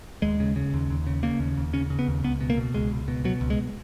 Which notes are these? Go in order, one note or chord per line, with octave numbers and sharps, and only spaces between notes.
D#2 G#3
C#3
C#3
D#2
D#2
C#3
C#3 A#3
D#2
D#2
C#3 C#4
C#3
B3
D#2
C#2 B3
B2
A#3
B2
C#2 G#3
C#2
B2
B2 F#3
C#2
G#3